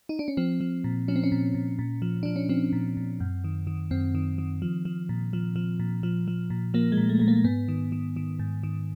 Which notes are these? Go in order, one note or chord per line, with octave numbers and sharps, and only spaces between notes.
D#4
D4
C#4
F3 C4
F3
A#2
F3 C#4
C4
C#4
A#2
A#2
A#2
F3
F3 D4
C#4
F3 C4
A#2
A#2
F#2
D#3
D#3
F#2 C4
D#3
D#3
F3
F3
A#2
F3
F3
A#2
F3
F3
A#2
F3 A#3
G#3
A#2
A3
A#2 A3
A#3
G#2 B3
D#3
D#3
D#3
G#2
D#3